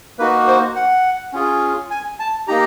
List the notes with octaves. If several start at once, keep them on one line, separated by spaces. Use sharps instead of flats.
A#3 D#4 F#4 B4
C5
F#5
C#4 F4 G#4
G#5
A5
A#3 D#4 G4 A#5